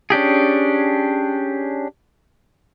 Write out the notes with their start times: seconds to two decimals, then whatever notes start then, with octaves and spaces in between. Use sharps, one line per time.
0.10 C#4 D4 G4 G#4